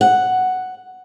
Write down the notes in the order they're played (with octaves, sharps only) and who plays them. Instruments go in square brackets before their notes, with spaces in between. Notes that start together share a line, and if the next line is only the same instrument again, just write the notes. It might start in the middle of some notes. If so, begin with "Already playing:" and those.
[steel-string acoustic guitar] F#5